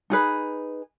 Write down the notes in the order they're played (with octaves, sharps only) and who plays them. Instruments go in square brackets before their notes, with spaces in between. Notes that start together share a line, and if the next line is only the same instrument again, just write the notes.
[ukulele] D#4 G#4 B4